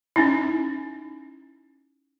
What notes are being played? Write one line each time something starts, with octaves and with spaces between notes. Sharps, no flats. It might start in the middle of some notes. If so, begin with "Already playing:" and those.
C#4 D#4 E4